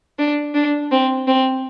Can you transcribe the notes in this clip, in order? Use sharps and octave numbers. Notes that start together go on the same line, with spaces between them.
D4
D4
C4
C4